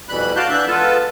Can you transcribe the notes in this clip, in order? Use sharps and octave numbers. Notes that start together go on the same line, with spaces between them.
F2 B2 E3 G3 B5 F#6
F#4 D5 F5 A5 F#6 G6
E3 B3 D4 E5 F#6 G6
G#3 B3 F4 A4 B4 A5